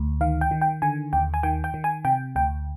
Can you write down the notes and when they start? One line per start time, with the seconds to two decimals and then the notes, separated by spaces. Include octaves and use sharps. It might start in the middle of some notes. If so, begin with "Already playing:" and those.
Already playing: D2
0.21 D#3 F5
0.41 G5
0.51 D#3
0.61 G5
0.82 D3 G#5
1.13 D#2 G5
1.34 G#5
1.43 D#3 G5
1.64 G5
1.74 D#3
1.84 G#5
2.05 C3 G5
2.36 D2 G5